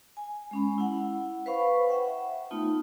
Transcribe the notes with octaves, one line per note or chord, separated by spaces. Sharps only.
G#5
G#3 C#4 B5
E4 F#5
B4 C5 F5 B5 C#6
E5 F#5 G5
A3 B3 D#4 F4